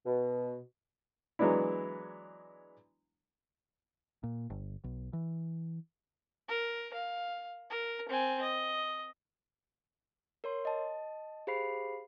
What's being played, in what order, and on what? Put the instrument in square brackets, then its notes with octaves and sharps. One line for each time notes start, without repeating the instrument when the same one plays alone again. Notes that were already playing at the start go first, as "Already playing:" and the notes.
[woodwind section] B2
[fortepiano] E3 F#3 G#3 B3 D4 E4
[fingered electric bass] A#2
G1
B1
E3
[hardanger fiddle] A#4
F5
A#4
C4 G#5
D#5
[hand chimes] A#4 C#5 C6
D#5 A5
G4 G#4 C5 F5 B5 C7